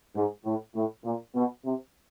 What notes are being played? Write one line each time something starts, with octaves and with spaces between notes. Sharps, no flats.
G#2
A2
A2
A#2
B2
C3